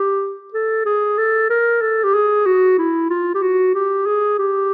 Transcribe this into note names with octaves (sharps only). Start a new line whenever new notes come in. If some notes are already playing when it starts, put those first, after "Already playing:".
Already playing: G4
A4
G#4
A4
A#4
A4
G4
G#4
F#4
E4
F4
G4
F#4
G4
G#4
G4